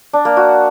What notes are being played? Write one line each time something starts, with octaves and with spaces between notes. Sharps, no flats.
D4
A#3
F#4